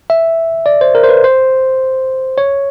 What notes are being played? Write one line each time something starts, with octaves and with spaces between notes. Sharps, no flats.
E5
D5
C5
A#4
C5
B4
C5
C#5